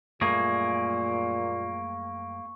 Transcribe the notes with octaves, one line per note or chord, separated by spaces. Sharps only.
F#2 A#2 G3 A3 A#3 G#4 C#6